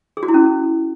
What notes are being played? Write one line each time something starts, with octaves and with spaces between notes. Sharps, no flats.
G#4
F#4
E4
C#4